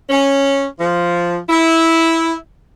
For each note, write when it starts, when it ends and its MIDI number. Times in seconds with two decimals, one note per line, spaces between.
0.10 0.66 61
0.79 1.37 53
1.48 2.34 64